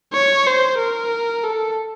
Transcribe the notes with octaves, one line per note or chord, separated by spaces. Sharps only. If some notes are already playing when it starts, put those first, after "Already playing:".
C#5
C5
A#4
A4